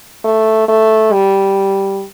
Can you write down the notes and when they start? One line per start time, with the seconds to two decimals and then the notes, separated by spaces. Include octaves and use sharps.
0.25 A3
0.68 A3
1.12 G3